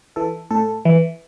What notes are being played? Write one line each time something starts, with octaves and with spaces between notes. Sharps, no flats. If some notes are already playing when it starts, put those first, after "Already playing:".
E3 A4
A2 A4
E3